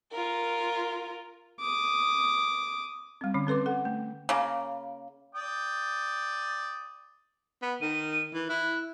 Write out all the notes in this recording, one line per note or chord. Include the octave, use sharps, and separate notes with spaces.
F4 A#4
D6 D#6
G3 C4
D3 G3 C#4
C4 A4 B4 C6 D6
A4 F#5
A3
C#3 A#3
D5 G5 D#6
B3
D#3 D#7
E3
E4 F#6